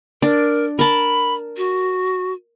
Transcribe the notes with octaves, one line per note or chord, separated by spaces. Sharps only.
D4 A#4
A#4 A5 B5
F#4